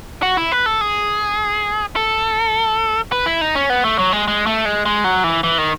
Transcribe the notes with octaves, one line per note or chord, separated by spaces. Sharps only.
F#4
E4
B4
A4
G#4
A4
B4
E4
D#4
C#4
B3
A3
F#3
G#3
G#3
A3
G#3
G#3
F#3
E3
E3
D#3